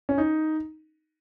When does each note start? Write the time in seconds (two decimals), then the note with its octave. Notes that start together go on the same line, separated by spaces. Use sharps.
0.09 C#4
0.18 D#4